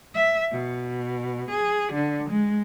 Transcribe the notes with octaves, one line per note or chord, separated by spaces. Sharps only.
E5
B2
G#4
D3
G#3